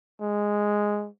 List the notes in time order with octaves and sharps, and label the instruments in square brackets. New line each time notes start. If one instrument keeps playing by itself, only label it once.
[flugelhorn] G#3